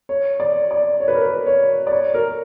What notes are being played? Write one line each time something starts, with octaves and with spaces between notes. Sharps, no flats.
C#5
D5
D5
C#5
B4
A#4
B4
C#5
D5
C#5
A#4